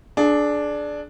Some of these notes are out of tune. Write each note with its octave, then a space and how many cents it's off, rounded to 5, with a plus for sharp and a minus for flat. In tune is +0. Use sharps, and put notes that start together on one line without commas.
D4 +0 G#4 +30